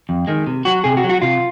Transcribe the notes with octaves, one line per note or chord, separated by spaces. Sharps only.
F2
D#3 G#3
C3
F#3 F#4
C3 G#4
F#4
F#3
F#4
C3 F4